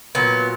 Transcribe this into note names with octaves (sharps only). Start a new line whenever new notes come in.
A#2 F#3 B3